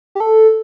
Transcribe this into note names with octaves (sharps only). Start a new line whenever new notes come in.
G4
A4